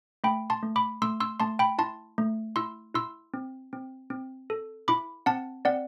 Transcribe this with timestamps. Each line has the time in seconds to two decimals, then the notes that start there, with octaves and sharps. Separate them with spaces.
0.24 A3 G5 B5
0.50 A5 C6
0.63 A3
0.76 B5 D6
1.02 A3 C6 E6
1.20 C6 E6
1.40 A3 A5 C6
1.59 G5 B5
1.78 E4 A5 C6
2.18 A3
2.56 E4 C6 E6
2.94 E4 C6 E6
3.34 C4
3.73 C4
4.10 C4
4.50 A4
4.88 E4 B5 D6
5.26 C4 F#5 A5
5.65 C4 D5 F#5